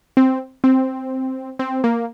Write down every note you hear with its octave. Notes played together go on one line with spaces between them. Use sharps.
C4
C4
C4
A#3